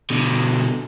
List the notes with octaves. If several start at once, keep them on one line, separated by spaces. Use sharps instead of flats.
B2 D3